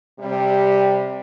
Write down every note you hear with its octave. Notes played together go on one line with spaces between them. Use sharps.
C3 G3